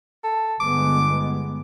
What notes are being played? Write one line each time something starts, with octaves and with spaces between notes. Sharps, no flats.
A4
G1 G#3 B3 D6